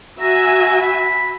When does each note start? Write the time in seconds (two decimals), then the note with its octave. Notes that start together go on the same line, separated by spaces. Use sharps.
0.20 F#4 E5 G#5 A#5
0.81 B5